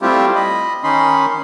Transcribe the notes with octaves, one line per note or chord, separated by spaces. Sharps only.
G3 A3 C4 E4 F4 G4
D#5 B5
D#3 C#4 D#4 B5 C6